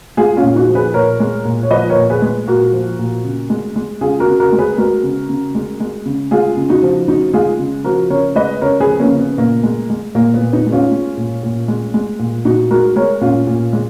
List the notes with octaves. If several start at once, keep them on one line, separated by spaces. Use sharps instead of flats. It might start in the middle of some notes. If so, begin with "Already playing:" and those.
G#3 F4 G#4
C#4 F4
A#2
D#4 F#4
F3
G#4 B4
A#2 A#4 C#5
G#3
A#2
C#5
F3 B4 D#5
A#4 C#5
A#2
G#4 B4
G#3
A#2 F#4 A#4
F3
A#2
C#3
G#3
G#3
C#3 F4 G#4
F#4 A#4
C#3
F#4 A#4
G#3
G#4 B4
G#3 F#4 A#4
C#3
C#3
G#3
G#3
C#3
G#3 F4 G#4
C#3
D#4 F#4
F3
C#3 D#4 F#4
G#3 F4 G#4
C#3
F3 F#4 A#4
C#3 A#4 C#5
G#3 B4 D#5
C#3 A#4 C#5
G#4 B4
F3
A#3 C#4
C#3
B3
A#2 A#3
G#3
G#3
A#2 A#3
B3
A#2
B3 D#4
G#3
C#4 F4
G#3
A#2
A#2
G#3
G#3
A#2
A#2 D#4 F#4
G#3 F#4 A#4
G#3 A#4 C#5
A#2 C#4 F4
A#2
G#3